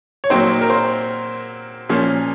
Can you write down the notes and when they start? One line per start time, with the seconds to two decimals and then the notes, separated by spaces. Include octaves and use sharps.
0.24 C#5
0.30 A#2 F#3 C4 D#4 C5
0.61 A#4
0.70 C5
1.89 A#2 F3 A#3 C#4